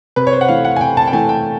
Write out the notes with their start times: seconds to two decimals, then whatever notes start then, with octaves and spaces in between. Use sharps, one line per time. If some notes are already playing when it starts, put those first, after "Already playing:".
0.16 C3 B4
0.27 C#5
0.33 C5
0.41 F#5
0.48 E3 A3 F5
0.65 F#5
0.76 G#5
0.81 C3 G5
0.97 A5
1.08 G5
1.13 E3 A3 G#5
1.29 G5